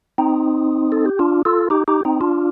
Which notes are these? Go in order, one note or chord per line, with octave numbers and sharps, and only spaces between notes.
C4 D#4
A4
G4
D4 F4
F4 A4
D#4 G4
D#4 G4
C4 D#4
D4 F4